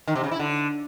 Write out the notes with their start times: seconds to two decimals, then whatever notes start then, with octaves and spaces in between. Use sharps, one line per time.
0.07 D#3
0.15 C3
0.23 C#3
0.31 E4
0.39 D3